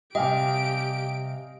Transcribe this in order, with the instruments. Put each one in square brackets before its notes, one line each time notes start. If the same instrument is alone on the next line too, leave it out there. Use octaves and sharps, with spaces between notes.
[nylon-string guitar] C3 G3 [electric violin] G4 D7 [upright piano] D#5 F5 G#5 [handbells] G5